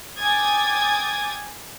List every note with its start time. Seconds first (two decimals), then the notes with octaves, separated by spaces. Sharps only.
0.19 G5 G#5 D6 D#6 G#6 A6